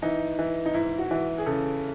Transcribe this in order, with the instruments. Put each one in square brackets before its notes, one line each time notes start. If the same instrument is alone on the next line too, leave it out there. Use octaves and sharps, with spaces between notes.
[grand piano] E3 [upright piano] D#4
[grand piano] E3
[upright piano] D#4
[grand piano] G#2 [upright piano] E4
[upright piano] F#4
[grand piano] E3
[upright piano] G#4
[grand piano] C#3 [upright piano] A4